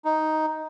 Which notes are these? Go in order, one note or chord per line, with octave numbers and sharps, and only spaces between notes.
D#4